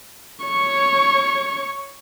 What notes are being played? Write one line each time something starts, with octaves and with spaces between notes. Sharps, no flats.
C#5 C#6